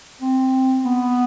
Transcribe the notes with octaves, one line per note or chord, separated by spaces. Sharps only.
C4
B3